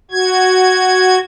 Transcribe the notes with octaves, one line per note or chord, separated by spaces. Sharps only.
F#4 G#6